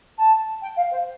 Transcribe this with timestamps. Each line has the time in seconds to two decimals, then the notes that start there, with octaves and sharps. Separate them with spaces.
0.17 A5
0.61 G5
0.76 F5
0.90 C5